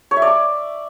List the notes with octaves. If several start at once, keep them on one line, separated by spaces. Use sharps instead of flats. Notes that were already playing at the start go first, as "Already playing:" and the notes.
C#5
E5
D5
D6